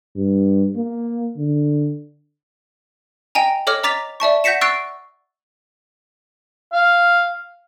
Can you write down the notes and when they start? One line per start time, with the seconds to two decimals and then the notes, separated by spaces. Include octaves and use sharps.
0.16 G2
0.76 A#3
1.37 D3
3.35 D#5 G5 G#5 A#5
3.67 A4 C#5 D#5 D6 F6
3.83 D#5 A#5 D6 A6 B6 F7
4.20 D5 E5 A5 C#6
4.44 F#5 G6 A#6 B6 C#7 E7
4.61 C#6 E6 F#6 A6 C7 D7
6.73 F5